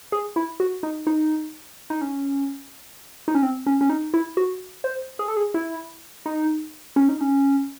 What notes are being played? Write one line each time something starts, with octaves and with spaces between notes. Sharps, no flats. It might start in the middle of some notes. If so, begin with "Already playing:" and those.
G#4
E4
F#4
D#4
D#4
D#4
C#4
D#4
C#4
C4
C#4
C#4
D#4
E4
F#4
C5
G#4
A4
G#4
E4
D#4
C#4
D#4
C#4